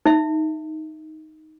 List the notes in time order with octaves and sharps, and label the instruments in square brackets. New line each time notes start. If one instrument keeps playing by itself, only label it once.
[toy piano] D#4 E5